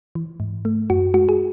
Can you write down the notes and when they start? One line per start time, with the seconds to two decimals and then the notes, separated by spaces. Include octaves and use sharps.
0.15 E3
0.40 G#2
0.65 A3
0.90 F#2 F#4
1.14 G#3 F#4
1.29 G#4